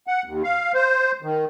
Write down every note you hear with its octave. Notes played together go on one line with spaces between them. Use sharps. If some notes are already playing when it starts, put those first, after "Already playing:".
F#5
D#2
F5
C5
D#3